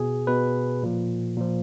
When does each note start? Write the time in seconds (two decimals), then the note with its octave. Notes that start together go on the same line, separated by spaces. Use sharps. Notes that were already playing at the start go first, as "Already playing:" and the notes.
Already playing: B2 G#4
0.27 B2 B4
0.83 A#2 F3
1.38 A#2 F3